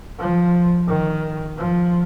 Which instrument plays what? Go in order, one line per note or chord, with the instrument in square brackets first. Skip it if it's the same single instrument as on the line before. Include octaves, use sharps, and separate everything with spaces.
[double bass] F3
D#3
F3